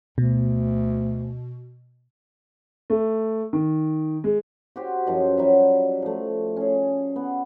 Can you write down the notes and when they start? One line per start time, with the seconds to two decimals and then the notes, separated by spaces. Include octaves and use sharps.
0.18 D2 B2
2.90 A3
3.53 D#3
4.24 G#3
4.76 F#4 G4 C5
5.07 F#2 F3 D#5
5.38 F#3 G3 E5
6.02 F3 A3
6.56 C#4 G#4
7.16 B3